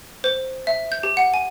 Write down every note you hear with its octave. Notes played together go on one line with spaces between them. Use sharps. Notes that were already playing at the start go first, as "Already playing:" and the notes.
C5
E5
G6
G4
F#5
G#5